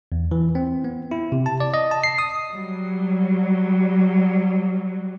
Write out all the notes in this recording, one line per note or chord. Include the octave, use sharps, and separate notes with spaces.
E2
E3
C4
B3
E4
C3
A5
D5
D#5
A5
C7
D#6
F#3 G3